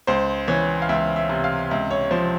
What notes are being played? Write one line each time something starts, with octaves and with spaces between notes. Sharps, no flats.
C#2 C5
E3 C#5
F5
C#2 E5
E5
C3
F5
C#2 E5
C#5
F3 C5